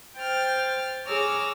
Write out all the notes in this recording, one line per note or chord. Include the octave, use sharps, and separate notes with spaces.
C5 G5 F6 A6
G#4 C#5 A#5 D6 E6 F6